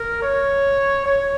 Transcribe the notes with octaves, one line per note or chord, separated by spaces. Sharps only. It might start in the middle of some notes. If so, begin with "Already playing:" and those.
Already playing: A#4
C#5
C#5